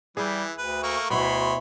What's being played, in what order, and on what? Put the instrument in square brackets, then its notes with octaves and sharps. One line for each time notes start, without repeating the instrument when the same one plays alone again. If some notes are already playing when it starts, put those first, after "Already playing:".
[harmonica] E3 [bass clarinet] G3 [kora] G#4 E5
[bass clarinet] D2 [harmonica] B4
[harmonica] A3 A#3 C#6
[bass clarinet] D2 [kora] B2 E4 [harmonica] C#5 B5 C6